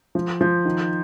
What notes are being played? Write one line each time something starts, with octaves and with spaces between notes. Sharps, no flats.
F3
F3
D#3